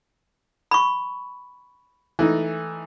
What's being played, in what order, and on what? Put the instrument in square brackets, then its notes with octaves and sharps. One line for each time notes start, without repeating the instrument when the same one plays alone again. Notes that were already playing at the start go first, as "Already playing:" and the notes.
[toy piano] B5 C#6
[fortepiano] E3 A3 D#4